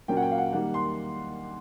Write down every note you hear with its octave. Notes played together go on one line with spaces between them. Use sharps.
A#2 F#3 A#3 C#4 G5
F#5
G5
F5
F#5
D#3 G3 A#3 F#5
C6